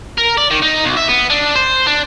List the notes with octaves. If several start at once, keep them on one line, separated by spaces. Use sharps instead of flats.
A#4
D5
D#3
D#4
B1
E5
B3
D4
C5
D4